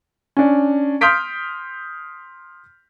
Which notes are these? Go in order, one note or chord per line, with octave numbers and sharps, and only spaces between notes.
C#4 D4
C6 D#6 F6 G6 B6 D7